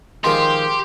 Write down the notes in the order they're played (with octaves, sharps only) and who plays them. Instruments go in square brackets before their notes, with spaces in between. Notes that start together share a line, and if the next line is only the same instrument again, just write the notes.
[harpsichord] D#3 F3 G#3 [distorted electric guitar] G4 [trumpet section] F5 G5 [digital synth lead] C6